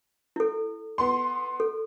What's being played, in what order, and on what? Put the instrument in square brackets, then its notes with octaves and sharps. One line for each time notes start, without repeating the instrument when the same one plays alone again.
[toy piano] E4 A4
[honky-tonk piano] B3 C6
[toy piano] A4